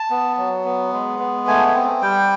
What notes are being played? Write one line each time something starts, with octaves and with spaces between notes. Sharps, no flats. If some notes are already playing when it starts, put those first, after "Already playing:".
Already playing: A5
B3
F#3
B3
G#3
B3
A3 G#5
C4
G3 G5